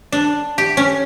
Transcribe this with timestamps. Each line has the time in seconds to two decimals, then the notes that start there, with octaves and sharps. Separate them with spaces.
0.12 D4
0.58 G4
0.77 C#4